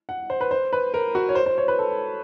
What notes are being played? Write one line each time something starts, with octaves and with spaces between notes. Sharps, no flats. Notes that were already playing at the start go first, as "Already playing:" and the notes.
F#5
C5
B4
C5
B4
A#4
F#4
C#5
C5
C5
C#5
B4
A4